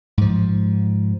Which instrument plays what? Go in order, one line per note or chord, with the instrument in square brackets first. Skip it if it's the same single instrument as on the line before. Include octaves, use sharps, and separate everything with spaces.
[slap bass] G#2 F3